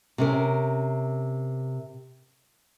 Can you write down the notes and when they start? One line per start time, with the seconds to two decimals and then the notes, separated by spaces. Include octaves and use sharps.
0.18 C3 C#4 A#4